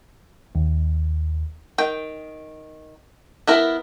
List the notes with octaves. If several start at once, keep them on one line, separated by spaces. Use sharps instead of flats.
D#2
D#3 G5
B3 E4 A#4